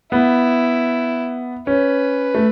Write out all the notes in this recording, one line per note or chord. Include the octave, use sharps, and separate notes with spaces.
B3 E4
C#4 B4
A3